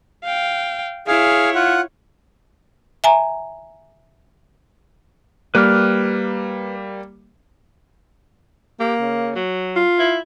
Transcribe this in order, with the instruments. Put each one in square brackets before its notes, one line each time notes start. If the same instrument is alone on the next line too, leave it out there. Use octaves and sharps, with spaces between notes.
[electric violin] F5 G5
[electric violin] E4 C#5 [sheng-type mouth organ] G#4 F5
[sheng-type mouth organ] F4 F#5
[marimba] E5 G#5 A#5
[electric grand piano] G3 A#3 [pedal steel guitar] B4 D6 F6
[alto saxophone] A#3 [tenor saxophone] G4
[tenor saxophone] C#3
F#3
[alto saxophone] F4
[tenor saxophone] E4